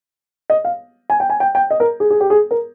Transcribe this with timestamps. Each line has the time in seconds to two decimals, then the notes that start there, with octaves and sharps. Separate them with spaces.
0.50 D#5
0.65 F5
1.10 G#5
1.20 G5
1.30 G#5
1.40 G5
1.55 G5
1.70 D#5
1.80 A#4
2.00 G#4
2.10 G#4
2.20 G4
2.30 G#4
2.51 A#4